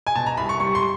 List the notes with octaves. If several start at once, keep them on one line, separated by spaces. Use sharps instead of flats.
G#5
B2 A5
A#5
C2 B5
C#6
G3 C#6
C6